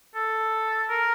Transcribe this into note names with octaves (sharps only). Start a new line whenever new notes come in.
A4
A#4